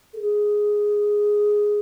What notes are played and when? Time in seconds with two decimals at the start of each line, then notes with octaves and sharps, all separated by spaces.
0.13 A4
0.19 G#4